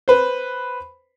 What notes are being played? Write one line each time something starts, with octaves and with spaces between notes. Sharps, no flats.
B4 C5